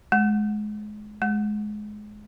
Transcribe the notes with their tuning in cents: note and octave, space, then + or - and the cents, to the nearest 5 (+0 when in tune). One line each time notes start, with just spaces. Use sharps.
G#3 +25
G#3 +20